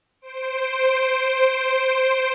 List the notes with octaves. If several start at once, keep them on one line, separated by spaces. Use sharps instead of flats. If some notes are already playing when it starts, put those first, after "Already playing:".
C5 D7